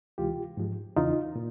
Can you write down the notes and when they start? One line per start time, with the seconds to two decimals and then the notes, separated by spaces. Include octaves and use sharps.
0.18 D2 C3 E3 G#3 F4 G4
0.57 G#2 F3 G#3
0.96 E2 C#3 E3 D#4 F4
1.36 A#2